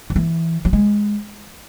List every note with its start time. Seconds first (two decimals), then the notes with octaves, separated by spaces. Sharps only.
0.10 F#3
0.16 E3
0.65 F#3
0.73 G#3